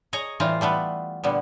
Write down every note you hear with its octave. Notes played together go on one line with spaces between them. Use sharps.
G#4 C#5 D#5 G#5 A#5
A2 E3 G3 F4 C5 A#5
G3 A3 B3 B4
A#2 D3 G3 B3